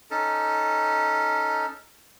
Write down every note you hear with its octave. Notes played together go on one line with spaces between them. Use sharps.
C#4 D#4 A4